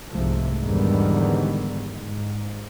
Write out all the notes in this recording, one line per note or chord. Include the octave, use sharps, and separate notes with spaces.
C2 G#2 C3 F3 A3
E2 G#2 D3 D#3 G3 B3
G#2